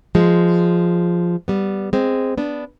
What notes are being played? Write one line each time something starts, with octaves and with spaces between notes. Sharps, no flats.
F3 G#3
G3 B3
G#3 C4
B3 D4